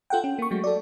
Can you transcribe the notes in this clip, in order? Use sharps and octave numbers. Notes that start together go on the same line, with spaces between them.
F4 A4 F#5 G5
C#4
A#3 C#6
F#3 G#3 A3 F#4
A4 D5